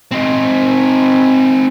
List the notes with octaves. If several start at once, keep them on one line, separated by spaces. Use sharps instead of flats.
C4 D#4